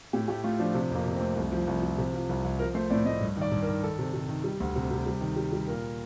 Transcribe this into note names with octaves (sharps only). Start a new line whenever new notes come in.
A2 G4
A3 G4
A3 F4
F3 D4
C3 D4
F2 A#3
C3
C4
A3
C2
F3
C2
F3
C3
F3
C2
C2
F3 A#4
A3 C5
A2 D5
A2 D#5
G2
D#3 D5
G2
A#4
D#3
D#3 A4
C3
C3
D#3
G3
D2
C3
C3
G3
D#3
G3
G3
A#2 A#4